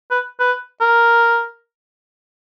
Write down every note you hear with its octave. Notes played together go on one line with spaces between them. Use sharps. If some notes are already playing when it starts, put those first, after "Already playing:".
B4
B4
A#4